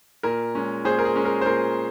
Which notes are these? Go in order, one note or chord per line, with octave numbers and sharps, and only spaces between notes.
A#2 A#4
G#3 C#4
A#2 G#4 C5
A#4
G#4
G#3 C#4
A#4
C5
A#2 A#4